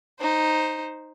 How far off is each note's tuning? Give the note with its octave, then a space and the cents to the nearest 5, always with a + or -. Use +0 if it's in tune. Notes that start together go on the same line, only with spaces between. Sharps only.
D#4 +0 C5 +5